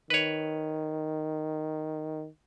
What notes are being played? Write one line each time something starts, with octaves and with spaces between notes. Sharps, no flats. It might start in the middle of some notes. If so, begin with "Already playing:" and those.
D#3 B4 C#5